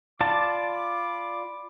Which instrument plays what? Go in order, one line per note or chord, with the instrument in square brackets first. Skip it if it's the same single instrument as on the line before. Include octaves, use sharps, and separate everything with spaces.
[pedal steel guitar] F4 D5 A5 [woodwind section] B5 D6